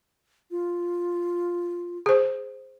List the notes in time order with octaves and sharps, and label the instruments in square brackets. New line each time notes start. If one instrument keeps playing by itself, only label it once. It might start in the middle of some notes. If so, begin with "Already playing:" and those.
[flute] F4
[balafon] G#4 C5